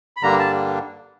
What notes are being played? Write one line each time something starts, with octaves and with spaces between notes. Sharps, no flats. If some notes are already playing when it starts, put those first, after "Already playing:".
B5
G2 D3 G3 A#3 D4 A#5
A5